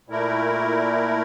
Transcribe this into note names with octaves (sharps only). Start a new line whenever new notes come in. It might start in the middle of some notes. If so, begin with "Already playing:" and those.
A#2 A3 E4 A#4